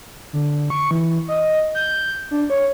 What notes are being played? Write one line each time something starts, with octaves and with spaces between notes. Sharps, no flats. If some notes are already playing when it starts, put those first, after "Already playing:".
D3
C#6
E3
D#5
G6
D4
C#5